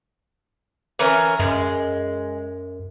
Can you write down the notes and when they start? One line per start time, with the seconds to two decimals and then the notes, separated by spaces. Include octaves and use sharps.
0.99 E3 C#4 A#4
1.40 F#2 G#3